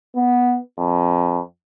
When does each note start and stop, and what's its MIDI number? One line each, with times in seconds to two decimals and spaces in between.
0.16 0.58 59
0.78 1.40 41